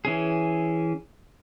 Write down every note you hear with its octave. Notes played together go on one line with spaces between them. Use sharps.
E3 C#4 G#4